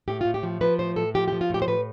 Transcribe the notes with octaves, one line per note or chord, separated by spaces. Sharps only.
A2 G4
A2 F4
G4
F3
F3 B4
A2 C5
A2 A4
F3 G4
G4
F3
F4
A2 G4
C5
A2 B4